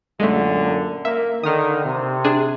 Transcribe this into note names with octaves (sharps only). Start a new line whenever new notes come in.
F#2 A#2 D3 G#3 A3
A#3 E5
D3 D#3 D#6 F6
C3
D4 G#4